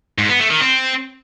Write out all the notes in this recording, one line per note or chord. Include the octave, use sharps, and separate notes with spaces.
G#2
B3
A3
D#3
C4